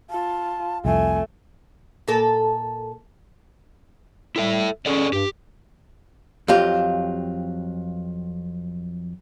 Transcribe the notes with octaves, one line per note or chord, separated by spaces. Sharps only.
F4 A5
C2 F2 A3 G#5
A#2 A4 A#4
G3 E4 A4 E5
C#4 G#4 A4 D5
G2 G4
F2 F#3 F4 G4